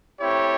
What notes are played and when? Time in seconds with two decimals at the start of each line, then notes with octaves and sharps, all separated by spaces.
0.20 A3 C4 E4 G4 C#5